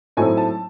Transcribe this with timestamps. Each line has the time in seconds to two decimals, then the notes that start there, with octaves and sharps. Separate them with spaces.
0.17 A2 F#3 A3 C4 D#4 G#5
0.37 A5